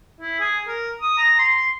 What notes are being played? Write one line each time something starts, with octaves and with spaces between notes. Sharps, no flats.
E4
G#4
A#4
D#6
A#5
C6